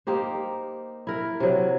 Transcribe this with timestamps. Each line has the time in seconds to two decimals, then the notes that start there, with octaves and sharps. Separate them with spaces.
0.07 A#3 D#4 G4 C5
1.07 E4 A#4
1.40 C3 F#3